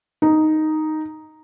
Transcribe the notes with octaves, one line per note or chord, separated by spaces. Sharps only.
D#4